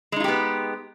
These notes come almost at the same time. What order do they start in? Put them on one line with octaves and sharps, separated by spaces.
G#3 D#4 F4 G4 B3